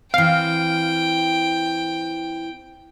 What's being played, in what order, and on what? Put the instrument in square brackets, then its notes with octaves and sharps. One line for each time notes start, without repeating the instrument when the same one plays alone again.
[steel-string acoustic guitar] E3 C4 [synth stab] F5 [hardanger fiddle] G5